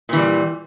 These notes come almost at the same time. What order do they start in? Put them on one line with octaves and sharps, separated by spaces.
A#2 E3 G3